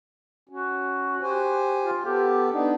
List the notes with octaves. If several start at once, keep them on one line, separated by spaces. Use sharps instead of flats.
C#4 F#4
G4 C5 G#5
F4
B3 G4 A4
B3 D4 D#4